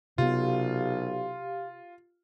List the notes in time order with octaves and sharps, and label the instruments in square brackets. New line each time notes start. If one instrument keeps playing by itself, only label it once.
[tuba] B1 [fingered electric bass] C3 B3 [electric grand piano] F4 [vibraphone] G4 F5